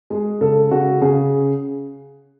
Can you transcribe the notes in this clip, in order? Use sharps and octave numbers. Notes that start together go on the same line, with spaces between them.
G#3 G#4
C#3 A4
C#3 F#4
C#3 G#4